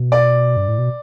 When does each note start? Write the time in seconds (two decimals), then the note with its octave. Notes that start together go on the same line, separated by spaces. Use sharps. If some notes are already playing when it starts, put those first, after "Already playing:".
Already playing: B2
0.12 D5
0.57 G2
0.68 A2
0.78 B2